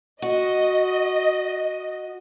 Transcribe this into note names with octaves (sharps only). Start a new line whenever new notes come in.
F#4 D#5